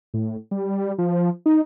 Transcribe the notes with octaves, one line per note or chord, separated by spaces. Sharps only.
A2
G3
F3
D#4